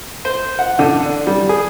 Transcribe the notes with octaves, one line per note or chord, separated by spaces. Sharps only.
C5
F#5
D3
D4
G3
G#4